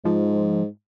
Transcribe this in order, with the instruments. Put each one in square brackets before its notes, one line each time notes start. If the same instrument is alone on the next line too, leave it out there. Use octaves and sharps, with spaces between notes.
[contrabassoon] G#2 [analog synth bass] F3